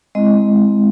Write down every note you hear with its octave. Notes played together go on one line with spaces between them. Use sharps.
G#3 C4 E4 D#5